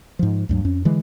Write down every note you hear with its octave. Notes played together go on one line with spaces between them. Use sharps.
G#2 F3
D2 G2 F#3
F2 C#4
D3 E3 G#3